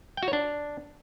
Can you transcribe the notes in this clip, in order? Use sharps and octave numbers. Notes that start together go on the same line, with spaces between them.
G5
F#4
C#5
D4